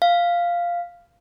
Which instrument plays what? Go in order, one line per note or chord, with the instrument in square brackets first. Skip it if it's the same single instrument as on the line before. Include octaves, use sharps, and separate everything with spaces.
[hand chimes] F5